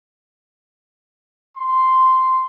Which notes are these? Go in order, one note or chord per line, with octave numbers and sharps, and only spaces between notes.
C6